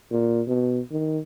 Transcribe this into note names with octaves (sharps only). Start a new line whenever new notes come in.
A#2
B2
D#3